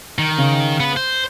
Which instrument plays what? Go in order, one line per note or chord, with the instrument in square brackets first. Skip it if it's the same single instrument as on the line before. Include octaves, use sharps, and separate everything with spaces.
[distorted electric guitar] D#3
[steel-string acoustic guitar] C#3
[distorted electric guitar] B3 B4
C5